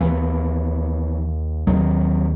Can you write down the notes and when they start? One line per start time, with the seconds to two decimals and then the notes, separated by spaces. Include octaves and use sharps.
0.01 D#2 E3
1.67 D#2 D#3 F#3